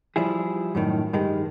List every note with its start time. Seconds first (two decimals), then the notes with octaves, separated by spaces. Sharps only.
0.16 F3 G3 E4 G#4
0.75 F#2 A2 D#3
1.13 G2 D#3 G#3